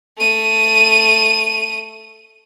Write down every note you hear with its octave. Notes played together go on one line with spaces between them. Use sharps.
A3 D#7